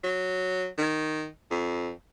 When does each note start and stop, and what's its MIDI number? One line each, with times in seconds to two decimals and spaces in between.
0.04 0.67 54
0.78 1.27 51
1.51 1.90 41